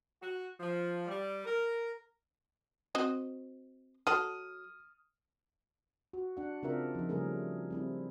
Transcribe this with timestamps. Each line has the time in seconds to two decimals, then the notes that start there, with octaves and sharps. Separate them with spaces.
0.21 F#4
0.60 F3
1.07 G3
1.44 A#4
2.95 C4 F#4 D#5
4.07 F#3 A4 D#6 F6 D#7
6.13 F#4
6.37 D4 F#5
6.63 C#3 C4 D4 F4 A#4 E5
6.95 F3 D#4
7.09 C#3 F#3 G3 A3 G#4 A#4
7.70 G3 C4 E4